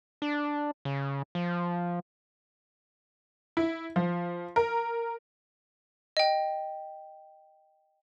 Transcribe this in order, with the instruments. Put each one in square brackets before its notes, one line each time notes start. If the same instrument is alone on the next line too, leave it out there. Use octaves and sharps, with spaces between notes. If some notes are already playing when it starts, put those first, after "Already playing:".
[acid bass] D4
C#3
F3
[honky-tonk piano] E4
F3
A#4
[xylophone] D#5 G5